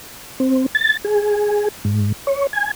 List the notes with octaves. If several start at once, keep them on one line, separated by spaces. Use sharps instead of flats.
C4
A6
G#4
G#2
C#5
G#5